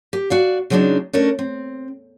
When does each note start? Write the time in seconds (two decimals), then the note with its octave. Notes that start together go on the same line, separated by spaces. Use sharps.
0.13 G4
0.30 F#4 D5 F5
0.70 C#3 F#3 G#3 C4 D4 D#4
1.13 A3 C#4 D4 A4 A#4
1.39 C4